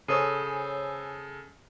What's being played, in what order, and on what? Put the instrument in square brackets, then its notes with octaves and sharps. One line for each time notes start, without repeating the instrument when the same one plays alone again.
[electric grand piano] C#3 A4 [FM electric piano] C5 C#5 G#5 [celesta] D#6 C7 D#7